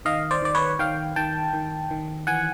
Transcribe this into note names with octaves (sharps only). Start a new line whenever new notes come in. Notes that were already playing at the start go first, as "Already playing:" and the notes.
D#3 D#5 F5
C5 D5
D#3 D5
B4 C#5
D#3 F5 G5
D#3 G5 A5
D#3
D#3
E3 F#5 G#5